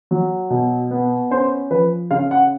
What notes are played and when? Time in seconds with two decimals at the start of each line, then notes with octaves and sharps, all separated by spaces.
0.11 F#3
0.50 B2
0.91 B3
1.31 C#4 C5
1.70 F3 B4
2.11 C#3 F5
2.31 F#5